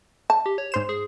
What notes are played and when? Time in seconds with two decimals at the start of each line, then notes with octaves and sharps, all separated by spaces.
0.30 A5
0.46 G4
0.58 C#5
0.72 G#2 C5 E7
0.89 G#4